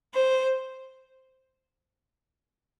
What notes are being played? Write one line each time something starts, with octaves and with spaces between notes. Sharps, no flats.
C5